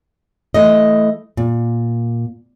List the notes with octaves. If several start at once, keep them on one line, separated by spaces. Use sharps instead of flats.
E3 A3 D#5
A#2